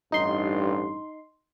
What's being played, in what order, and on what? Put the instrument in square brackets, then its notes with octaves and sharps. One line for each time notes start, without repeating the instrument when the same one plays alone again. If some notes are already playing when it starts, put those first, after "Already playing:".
[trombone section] A1 G2 [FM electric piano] D#4 C6